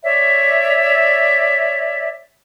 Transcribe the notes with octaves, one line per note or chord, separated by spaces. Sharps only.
C#5 D5 E5